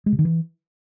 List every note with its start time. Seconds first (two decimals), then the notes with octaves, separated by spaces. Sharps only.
0.06 G#3
0.12 C3
0.19 D#3
0.25 E3